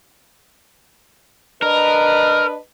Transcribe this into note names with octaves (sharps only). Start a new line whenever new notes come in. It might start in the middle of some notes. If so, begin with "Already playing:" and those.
D4 A#4 B4 D#5